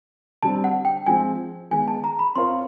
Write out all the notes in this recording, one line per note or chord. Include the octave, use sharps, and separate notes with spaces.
D3 G3 C4 A5
F#5
G5
F3 G#3 C4 G#5
D#3 G#3 B3 D#4 G#4 G#5
A5
A#5
B5
C4 F4 A#4 C#5 F5 C6